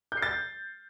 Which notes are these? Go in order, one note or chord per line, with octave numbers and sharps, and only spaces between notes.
G6
C7
A6